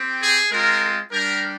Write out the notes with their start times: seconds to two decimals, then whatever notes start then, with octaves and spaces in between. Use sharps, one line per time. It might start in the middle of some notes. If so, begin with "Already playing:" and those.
Already playing: C4 G4
0.21 G#4
0.51 G#3 C4 F4 A#4
1.12 G3 D4 G4 A#4